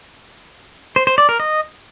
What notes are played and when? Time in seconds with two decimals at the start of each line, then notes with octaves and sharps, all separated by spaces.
0.96 C5
1.07 C5
1.18 D5
1.29 A#4
1.40 D#5